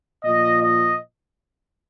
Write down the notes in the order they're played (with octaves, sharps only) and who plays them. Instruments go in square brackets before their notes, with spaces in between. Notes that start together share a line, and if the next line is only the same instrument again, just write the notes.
[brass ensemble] A#2 F3 D#5
D#5